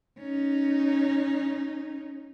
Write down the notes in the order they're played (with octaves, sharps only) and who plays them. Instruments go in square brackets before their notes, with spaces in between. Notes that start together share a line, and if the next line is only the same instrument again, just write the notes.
[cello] C#4 D#4